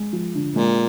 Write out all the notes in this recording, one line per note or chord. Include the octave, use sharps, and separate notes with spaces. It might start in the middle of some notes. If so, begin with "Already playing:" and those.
Already playing: G#3
F3
D3
A#2 G#3